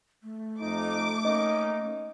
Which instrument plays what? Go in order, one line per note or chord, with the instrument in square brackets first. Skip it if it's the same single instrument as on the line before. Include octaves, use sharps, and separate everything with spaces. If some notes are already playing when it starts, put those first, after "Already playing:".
[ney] A3
[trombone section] F2 D#4 [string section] D6
[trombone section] A#3 C#4 D#4 [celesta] D#5